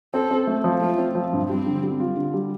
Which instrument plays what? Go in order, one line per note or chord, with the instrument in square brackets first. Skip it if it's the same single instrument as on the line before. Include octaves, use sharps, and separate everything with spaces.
[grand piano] C4 [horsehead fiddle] A4
[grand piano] C4
A3
F3
[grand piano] A3 [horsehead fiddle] F4
[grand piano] C4
F3
G2
[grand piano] G3 [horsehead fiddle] C4
[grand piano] D3
G3
F4
D3
G3